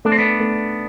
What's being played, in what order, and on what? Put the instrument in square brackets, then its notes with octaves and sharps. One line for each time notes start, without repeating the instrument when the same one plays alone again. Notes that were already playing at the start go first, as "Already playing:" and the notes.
[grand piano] A3 [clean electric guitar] D4
[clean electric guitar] C4
B3 D4
[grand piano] A3